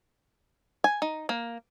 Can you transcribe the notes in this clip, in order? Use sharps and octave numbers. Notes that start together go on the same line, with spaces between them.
G#5
D#4
A#3